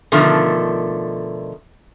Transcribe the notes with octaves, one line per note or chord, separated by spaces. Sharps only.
B2 D3 D#3 F3 A3